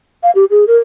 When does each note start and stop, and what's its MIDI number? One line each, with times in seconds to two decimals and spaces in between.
0.23 0.31 77
0.35 0.45 67
0.50 0.65 68
0.67 0.77 70